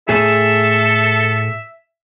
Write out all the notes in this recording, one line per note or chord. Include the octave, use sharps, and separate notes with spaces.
A2 G#4 A4 E5